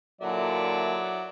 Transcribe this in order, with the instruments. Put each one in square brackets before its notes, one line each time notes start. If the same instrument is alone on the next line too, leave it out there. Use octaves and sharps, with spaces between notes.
[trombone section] A#2 D3 E4 [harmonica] F#3 D5 E5